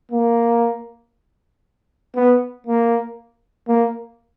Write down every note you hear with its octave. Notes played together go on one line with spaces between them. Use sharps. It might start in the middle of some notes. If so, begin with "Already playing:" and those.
A#3
B3
A#3
A#3